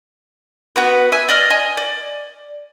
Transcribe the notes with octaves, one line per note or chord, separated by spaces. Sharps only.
B3 F#4 B4
E5 G#5
D5 D#5 F6
D#5 G#5
D5